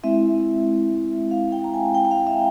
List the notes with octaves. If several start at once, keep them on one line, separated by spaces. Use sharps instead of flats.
G#3 C4 E4 E5
F5
G5
A#5
G#5
G5
G5
F5
E5